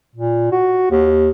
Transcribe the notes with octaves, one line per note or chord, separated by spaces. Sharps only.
A#2
F#4
D#2